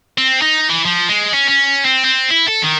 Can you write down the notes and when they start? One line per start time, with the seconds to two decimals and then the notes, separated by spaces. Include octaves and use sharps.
0.18 C4
0.42 D#4
0.70 E3
0.85 F3
1.09 G#3
1.33 C#4
1.49 C#4
1.85 C4
2.05 C4
2.30 E4
2.48 A4
2.62 D#3